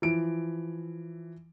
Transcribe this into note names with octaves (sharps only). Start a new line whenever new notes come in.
E3 F3 D7